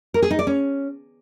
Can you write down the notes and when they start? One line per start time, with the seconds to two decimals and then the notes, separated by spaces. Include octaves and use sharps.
0.14 A#4
0.22 G#4
0.31 D#4
0.39 D5
0.47 C#4